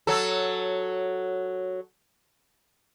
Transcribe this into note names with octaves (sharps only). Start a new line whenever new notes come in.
F#3 A4